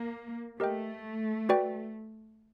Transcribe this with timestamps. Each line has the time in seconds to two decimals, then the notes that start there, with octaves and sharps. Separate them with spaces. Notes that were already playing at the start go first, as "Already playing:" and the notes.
Already playing: A#3
0.59 A3 G4 A#4 D#5 G5
1.49 F#4 B4 D5 G5